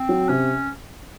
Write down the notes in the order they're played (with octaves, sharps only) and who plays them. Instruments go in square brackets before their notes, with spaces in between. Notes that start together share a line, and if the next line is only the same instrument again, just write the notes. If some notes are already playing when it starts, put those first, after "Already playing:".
Already playing: [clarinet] C4
[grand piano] F#3
[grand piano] C3 [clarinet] C#4